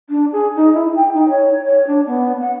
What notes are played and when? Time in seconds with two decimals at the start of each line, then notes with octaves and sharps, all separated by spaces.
0.10 D4
0.32 G#4
0.56 D#4
0.74 E4
0.96 G5
1.14 D#4
1.30 C#5
1.64 C#5
1.87 D4
2.07 B3
2.41 F#5